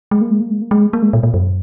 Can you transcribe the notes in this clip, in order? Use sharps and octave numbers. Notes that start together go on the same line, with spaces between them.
G#3
A#3
G#3
A#3
G#3
A#3
G#3
A#3
G#3
A#2
A#2
F#2